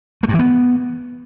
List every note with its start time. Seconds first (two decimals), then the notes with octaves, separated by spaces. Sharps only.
0.23 A3
0.28 G2
0.34 E3
0.39 B3